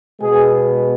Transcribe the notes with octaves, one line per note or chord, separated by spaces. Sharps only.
B2 G#3 B3 G#4